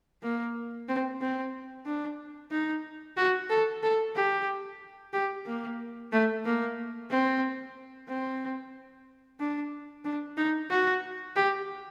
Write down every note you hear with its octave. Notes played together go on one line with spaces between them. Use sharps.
A#3
C4
C4
D4
D#4
F#4
A4
A4
G4
G4
A#3
A3
A#3
C4
C4
D4
D4
D#4
F#4
G4